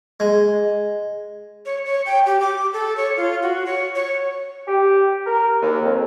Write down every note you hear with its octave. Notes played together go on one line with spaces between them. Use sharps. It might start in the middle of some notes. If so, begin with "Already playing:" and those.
G#3
C#5
C#5
G5
G4
D6
A4
C#5
F4
F#4
C#5
C#5
G4
A#4
D#2
F2